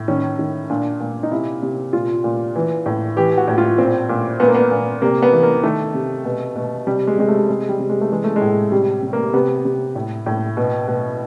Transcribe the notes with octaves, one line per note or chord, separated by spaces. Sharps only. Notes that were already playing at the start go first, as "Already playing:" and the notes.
Already playing: A2
D#3 C#4
D#3
A#2 D4
A#2
D#4
C3 E4
C3
A#2 F4
A#2
E3
A2
E3 G4
F#4
A2
F4
A#2 C4
A#2
A#2 B3
A#3
B3
A#2
C3 A#3
B3
E3
A#3
D#3 A3
C3
B2
B2
C3 G3
G#3
C3 G#3
A3
C3 G#3
G3
C3
G#3
A3
E3 G#3
A3
G#3
A2
C3 G3
C3
A#3
C3 B3
C3
A2
A2
B2
B2